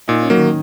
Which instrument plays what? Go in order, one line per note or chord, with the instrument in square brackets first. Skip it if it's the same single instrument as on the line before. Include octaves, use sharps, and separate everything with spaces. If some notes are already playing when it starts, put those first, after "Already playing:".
[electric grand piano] A#2 [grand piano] D#4
[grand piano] C#4
[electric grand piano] F#3 A#3
[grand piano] D#3